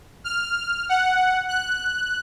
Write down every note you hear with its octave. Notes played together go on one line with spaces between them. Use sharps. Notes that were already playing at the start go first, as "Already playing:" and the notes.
F6
F#5
F#6